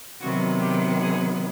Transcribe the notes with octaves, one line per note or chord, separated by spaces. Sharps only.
C3 D#3 F#3 B3 F#4
G4
G#4